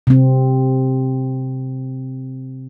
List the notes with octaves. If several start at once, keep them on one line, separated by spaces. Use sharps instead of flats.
C3 C4